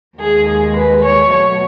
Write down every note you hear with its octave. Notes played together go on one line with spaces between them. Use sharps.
D#2 D#3 G#3 G#4
G#4
B4
C#5
B2 F#3 A3 C#5